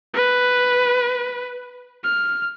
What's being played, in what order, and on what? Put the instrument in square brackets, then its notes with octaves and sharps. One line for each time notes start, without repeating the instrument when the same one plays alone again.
[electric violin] B4
F6